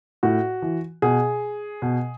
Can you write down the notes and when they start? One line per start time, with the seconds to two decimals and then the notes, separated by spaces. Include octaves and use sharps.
0.23 A2 F#4
0.62 E3
1.02 B2 G#4
1.82 B2